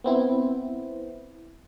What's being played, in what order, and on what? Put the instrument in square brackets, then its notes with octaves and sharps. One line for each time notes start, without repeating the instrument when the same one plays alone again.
[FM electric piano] B3 C4 E4